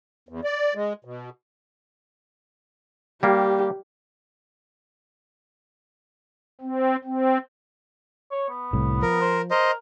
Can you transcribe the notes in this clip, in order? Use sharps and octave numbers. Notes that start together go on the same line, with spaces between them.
E2
D5
G#3
B2
G3 A#3 G4
C4
C4
C#5
B3
C2 A2
F3 A#4
C5
A#4 C5 D#5